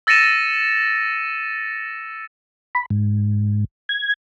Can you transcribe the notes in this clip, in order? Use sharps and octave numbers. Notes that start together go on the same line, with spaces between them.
E6 A6 A#6 C#7 D#7 E7
B5
G#2
G#6